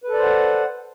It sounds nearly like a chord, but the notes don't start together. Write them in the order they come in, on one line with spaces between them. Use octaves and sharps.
B4 A4 D5 C5 F#5